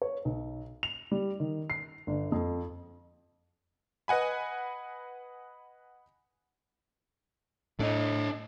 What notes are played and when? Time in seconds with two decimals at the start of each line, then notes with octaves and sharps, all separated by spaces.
0.02 C#5
0.25 B1
0.83 F7
1.12 G3
1.40 D#3
1.70 C7
2.07 G1
2.32 F2
4.08 B4 D#5 F#5 G#5 B5
7.80 A2 D4 D#5